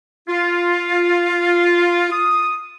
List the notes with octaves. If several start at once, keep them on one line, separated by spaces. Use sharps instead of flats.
F4
D#6